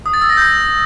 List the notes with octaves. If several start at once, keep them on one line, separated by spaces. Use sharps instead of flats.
D#6
A6
E6
A#6
G6